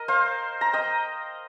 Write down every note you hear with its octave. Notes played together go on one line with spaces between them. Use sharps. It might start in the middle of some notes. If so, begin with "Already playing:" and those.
Already playing: A#4 D#5
C5 F5
A#5
D#5 G5